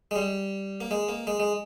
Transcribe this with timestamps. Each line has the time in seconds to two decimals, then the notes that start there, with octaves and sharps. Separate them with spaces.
0.11 G#3
0.16 G3
0.81 A#3
0.91 G#3
1.08 A#3
1.27 G#3
1.40 G#3